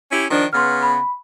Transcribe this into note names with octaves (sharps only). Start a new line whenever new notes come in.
C#4 E4 G4
D#3 F3 D4
C#3 B3 C6 F6
B5